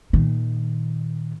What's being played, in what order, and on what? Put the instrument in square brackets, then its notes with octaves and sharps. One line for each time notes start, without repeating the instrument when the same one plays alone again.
[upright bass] A#2 D#3